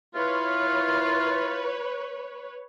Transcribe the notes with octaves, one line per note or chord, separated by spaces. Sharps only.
E4 F4 B4 C#5